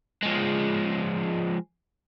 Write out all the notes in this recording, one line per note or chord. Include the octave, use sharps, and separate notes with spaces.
F3 G#3